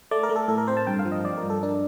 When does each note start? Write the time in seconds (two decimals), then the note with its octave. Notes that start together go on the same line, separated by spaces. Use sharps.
0.11 A3 D5
0.23 A#4
0.29 A3
0.36 A4
0.48 A2 A4
0.58 A#4
0.68 C4 C5
0.77 A5
0.87 G2 G5
0.99 F5
1.05 F3
1.12 D#5
1.24 F3 D5
1.37 A#4
1.43 G2
1.50 A4
1.63 D4 A#4